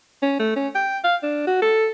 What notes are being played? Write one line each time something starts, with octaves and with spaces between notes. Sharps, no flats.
C#4
A3
C#4
G5
F5
D4
F#4
A4